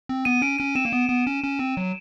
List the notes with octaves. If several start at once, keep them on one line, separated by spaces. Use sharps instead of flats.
C4
B3 D#7
C#4 D7
C#4 D#7
C4 E7
A#3
B3
B3
C#4
C#4
C4
F#3